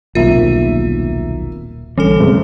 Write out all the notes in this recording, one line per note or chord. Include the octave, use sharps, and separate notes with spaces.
D#1 B1 C3 A#3 F4 E5
A#1 D3 E3 G3 C#4 A4
F#1 G#3 C4 C#4